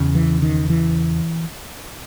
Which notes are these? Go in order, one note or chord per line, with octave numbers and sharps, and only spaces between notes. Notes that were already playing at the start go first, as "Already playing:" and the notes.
Already playing: E2 C#3
E3
D#3
E3